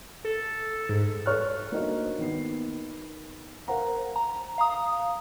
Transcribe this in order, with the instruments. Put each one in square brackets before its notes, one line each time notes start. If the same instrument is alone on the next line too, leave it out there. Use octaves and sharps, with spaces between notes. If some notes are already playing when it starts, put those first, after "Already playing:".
[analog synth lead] A4
G#2
[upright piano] A4 B4 C#5 C#6 F6 F#6
A#3 D4 D#4 F#4 C5 D#5
D#3 B3 C7
A#4 C5 F5 F#5 A#5
[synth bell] A#5
F5 A#5 D#6